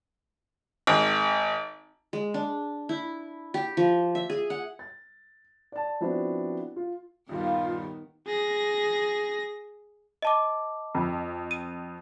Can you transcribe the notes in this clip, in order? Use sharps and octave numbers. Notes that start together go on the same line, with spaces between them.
G#1
G#3
D4
E4
G4
F3
E5
G#4
F#5
A6
D5 A5
F3 B3 C4 D4 E4 F#4
F4
D#1 G2 D#3 G3 B3 F4
G#4 A#6
D#5 A5 D6
F2
D#7